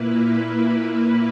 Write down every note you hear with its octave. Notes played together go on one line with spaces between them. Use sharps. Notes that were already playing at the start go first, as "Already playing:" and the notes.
Already playing: A#2 A#3 E4 B4